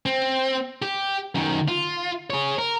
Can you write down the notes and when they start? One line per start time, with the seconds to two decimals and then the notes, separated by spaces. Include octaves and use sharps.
0.06 C4
0.82 G4
1.35 F#2 D#3
1.68 F4
2.30 G#4 C#5
2.59 A#4